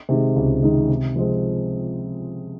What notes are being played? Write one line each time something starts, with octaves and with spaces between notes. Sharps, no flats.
C3 D#3 G#3
C#2
C3 D#3 G#3
C3
F3 G#3 C4